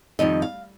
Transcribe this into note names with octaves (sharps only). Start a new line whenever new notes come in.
F2 D#3 G3 D#5
F5